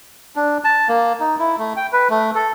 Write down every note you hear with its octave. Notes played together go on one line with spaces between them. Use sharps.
D4
A5
A#3
D#4
E4
A3
G5
B4
A3
A4